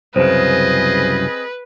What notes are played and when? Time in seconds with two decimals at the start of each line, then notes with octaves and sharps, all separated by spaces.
0.16 C2 F#2 C#3 C4 G#4 B4 C5 D#5